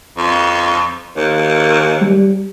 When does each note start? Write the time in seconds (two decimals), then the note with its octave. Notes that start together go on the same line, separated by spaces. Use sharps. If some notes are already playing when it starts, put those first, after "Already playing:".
0.18 F2
1.16 D#2
2.01 G3